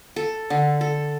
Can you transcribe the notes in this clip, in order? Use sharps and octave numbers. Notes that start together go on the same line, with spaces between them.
A4
D3
A4